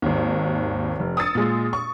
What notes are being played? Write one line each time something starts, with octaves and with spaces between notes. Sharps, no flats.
G#1 D#2
F1
D#6 E6 A6 C#7
A#2 G#3
C#6